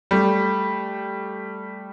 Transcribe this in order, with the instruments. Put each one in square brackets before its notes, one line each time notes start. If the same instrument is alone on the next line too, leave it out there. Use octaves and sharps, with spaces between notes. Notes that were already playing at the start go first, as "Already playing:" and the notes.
[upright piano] G3 A3